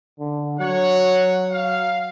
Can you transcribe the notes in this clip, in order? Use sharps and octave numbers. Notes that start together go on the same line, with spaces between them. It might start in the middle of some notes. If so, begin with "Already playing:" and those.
D3
F#3 C#5 F#5
F5